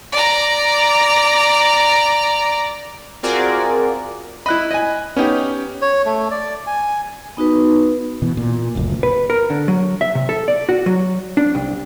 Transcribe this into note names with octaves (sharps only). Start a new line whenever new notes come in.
D5 A#5
C4 F4 F#4 G#4 A#4 D5
E4 D#5 B5 F#6
D#5 G#5
B3 C#4 D#4 G4
C#5
A3
D5
G#5
B3 D#4 F#4 B4
B2 E3
A#2
F#1 D2 A#2
B4
A#4
D3
F#3
E5
C3
A4
D5
F#4
F#3
D4
C2